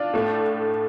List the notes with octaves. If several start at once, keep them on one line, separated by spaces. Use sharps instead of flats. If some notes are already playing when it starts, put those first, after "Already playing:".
Already playing: D4 F4
A2 A3